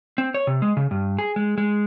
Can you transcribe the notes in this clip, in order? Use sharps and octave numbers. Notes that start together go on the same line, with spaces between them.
C4
C#5
C3
G#3
C#3
G2
G#4
G#3
G#3